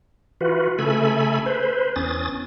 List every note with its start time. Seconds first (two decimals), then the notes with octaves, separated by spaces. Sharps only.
0.41 E3 F4 F#4 B4
0.79 C#3 A3 A4 G#5 B5
1.46 B4 C5
1.96 E2 C#4 D#6 A6